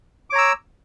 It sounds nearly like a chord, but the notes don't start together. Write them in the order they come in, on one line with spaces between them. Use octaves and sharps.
D6 C#5 A#5 E6